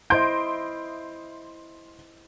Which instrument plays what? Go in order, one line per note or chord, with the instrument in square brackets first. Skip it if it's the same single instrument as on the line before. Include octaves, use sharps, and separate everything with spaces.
[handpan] E4 C5 D#5 [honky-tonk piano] C6 G6 D7